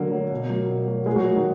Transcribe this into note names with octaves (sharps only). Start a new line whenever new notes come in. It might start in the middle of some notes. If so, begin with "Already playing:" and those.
Already playing: D3 F#3 A#3
F#3
B2
F#3
B2
F#3
A#2 G#3 G#4
F#3 F#4
F3 G#3
D#3 D#4